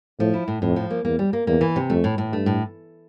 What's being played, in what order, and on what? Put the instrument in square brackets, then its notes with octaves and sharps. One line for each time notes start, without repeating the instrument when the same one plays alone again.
[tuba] A2 [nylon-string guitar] F3
[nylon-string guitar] E4
A2
[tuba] F2 [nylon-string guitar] A2
[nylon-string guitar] F3
A#3
[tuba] E2 [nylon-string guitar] A#3
[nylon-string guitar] G3
A#3
[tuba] E2 [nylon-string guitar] A#3
[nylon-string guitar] E3
C3
[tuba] F2 [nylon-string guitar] A3
[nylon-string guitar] A2
A2
[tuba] G2 [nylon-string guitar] A3
[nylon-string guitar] A2